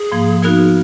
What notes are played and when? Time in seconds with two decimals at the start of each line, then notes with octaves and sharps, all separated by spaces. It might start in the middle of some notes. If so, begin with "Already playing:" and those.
Already playing: G#4
0.12 G#2 F3 A#3
0.42 F3 B3 D#4 F#4 A#4